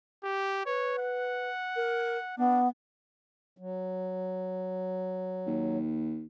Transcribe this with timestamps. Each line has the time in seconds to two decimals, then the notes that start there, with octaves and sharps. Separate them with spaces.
0.23 G4
0.66 B4 C#5
0.98 F#5
1.76 A#4
2.37 B3 D4
3.58 F#3
5.47 D#2